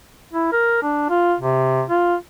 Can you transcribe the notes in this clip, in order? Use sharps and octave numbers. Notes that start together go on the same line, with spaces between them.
E4
A#4
D4
F4
C3
F4